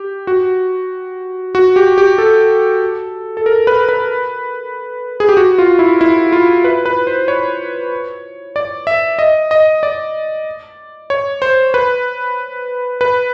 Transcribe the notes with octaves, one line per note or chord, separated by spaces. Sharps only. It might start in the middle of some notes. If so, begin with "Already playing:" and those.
Already playing: G4
F#4
F#4
G4
G4
A4
A4
A#4
B4
B4
G#4
G4
F#4
F4
E4
E4
F4
B4
B4
C5
C#5
D5
E5
D#5
D#5
D5
C#5
C5
B4
B4